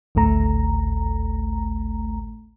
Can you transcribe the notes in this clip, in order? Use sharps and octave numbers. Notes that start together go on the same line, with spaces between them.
G#1 D2 A2 A3 A#5